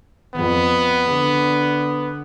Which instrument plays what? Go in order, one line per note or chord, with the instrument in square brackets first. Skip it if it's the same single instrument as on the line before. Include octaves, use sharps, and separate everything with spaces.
[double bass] F2 [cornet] B3
[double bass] D3 D4